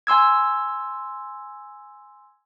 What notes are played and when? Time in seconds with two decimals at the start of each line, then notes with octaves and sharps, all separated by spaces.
0.07 G#5 C6 E6 G#6